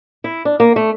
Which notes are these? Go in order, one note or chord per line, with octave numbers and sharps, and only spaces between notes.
E4
D4
A#3
A3